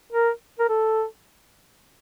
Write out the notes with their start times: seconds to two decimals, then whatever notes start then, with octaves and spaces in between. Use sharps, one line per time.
0.12 A#4
0.59 A#4
0.69 A4